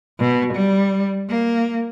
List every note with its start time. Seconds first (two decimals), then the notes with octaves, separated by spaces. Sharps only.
0.19 B2
0.54 G3
1.29 A#3